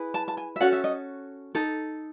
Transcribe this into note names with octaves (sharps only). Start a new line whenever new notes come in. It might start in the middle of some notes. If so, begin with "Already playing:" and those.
Already playing: E4 G#4 B4
A5
A5
G#5
E5
C#4 F#4 A4 F#5
E5
D#5
D#4 A4